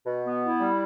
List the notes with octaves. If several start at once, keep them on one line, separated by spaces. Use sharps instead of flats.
B2
B3
E4
G3